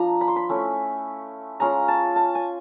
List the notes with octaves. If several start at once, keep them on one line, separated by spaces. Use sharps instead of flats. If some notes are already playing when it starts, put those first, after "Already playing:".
Already playing: F3 D4 A#5
B5
C6
B5
A3 C#4 E4
G#3 C#4 F4 A#5
A5
A5
G#5